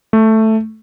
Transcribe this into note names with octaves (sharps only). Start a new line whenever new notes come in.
A3